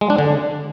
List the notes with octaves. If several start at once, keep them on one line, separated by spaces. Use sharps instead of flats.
G#3
D4
D3